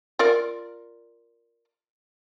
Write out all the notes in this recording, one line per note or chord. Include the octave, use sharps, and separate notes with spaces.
F4 A#4 D5